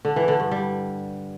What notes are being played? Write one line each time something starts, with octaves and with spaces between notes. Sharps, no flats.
D3
E3
D3
G2
G3